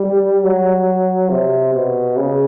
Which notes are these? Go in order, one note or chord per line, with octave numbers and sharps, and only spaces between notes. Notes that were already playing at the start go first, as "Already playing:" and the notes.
Already playing: G3
F#3
C3
B2
C#3